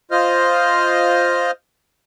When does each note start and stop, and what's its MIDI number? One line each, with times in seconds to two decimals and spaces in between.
0.11 1.51 65
0.11 1.51 72
0.11 1.51 75
0.11 1.51 89